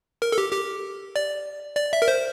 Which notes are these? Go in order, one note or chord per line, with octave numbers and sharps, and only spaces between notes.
A#4
A4
G4
G4
D5
D5
E5
A#4
C5